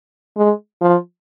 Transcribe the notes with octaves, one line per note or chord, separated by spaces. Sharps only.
G#3
F3